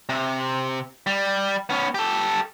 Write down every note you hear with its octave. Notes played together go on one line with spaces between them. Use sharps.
C3
G3
B3 C#4
G4 A4